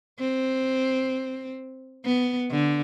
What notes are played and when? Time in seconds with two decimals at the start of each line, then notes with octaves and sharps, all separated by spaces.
0.19 C4
2.05 B3
2.51 D3